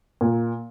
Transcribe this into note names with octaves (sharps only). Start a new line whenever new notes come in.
A#2